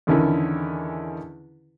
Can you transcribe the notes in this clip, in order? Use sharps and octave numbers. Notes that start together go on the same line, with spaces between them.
E2 D3 D#3 C#4 E4